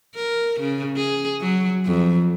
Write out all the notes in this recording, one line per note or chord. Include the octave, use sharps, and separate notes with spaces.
A#4
C#3
G#4
F#3
F2